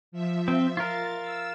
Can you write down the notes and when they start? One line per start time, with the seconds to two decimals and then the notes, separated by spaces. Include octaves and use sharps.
0.12 F3 E5
0.48 C4
0.77 F4 A#4 A6
1.21 E6